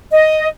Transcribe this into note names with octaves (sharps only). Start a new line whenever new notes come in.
D#5